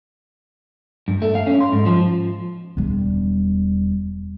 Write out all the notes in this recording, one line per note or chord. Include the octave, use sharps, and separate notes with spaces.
G2
A3
F5
C#4
C6
G#2
F3
E1 G3